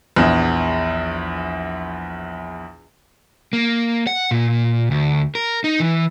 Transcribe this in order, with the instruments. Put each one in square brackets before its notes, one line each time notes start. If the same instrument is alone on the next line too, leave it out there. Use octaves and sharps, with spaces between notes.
[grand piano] A#1 E2
[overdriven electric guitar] A#3
F#5
A#2
D2
A#4
D#4
E3